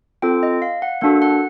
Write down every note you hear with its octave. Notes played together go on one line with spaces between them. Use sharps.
C4 F4 A4 G5
D#5
F5
F#5
A#3 D4 F#4 A4 F#5
F#5